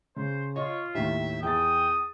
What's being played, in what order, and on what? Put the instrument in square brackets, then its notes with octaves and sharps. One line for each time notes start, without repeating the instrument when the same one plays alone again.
[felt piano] C#3 [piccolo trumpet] C5
[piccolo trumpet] F4 [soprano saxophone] C#5 [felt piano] D#5
[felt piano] D#2 A2 D#3 [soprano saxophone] E5
[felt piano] E2 A6 [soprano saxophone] G5 [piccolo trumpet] D#6